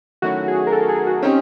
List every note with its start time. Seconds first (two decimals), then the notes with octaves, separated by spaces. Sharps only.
0.22 D#3 F#3 A3 C#4 E4 F#4
0.48 G#4
0.67 A#4
0.72 A4
0.82 A4
0.89 G#4
1.07 F#4
1.23 C4 C#4 D#4 G4